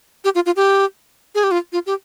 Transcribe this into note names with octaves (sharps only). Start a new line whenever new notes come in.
G4
F4
F4
G4
G#4
G4
F4
F4
G4